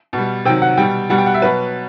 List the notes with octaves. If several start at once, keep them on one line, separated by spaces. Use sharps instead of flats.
B2 G3
C3 D#3 F#3 G5
F#5
B2 G3 G5
B2 G3 F#5
G5
F#5
E5
B2 F#3 B4